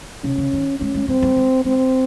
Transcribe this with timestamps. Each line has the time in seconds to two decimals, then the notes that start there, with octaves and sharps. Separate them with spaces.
0.24 C3 C#4
0.38 C#3
0.53 D#3
0.80 G#3 C#4
0.94 G#3
1.08 G3 C4
1.22 G3
1.37 G#3
1.65 G#3 C4